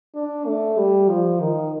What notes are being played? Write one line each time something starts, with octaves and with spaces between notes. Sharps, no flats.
D4
A3
G3
F3
D#3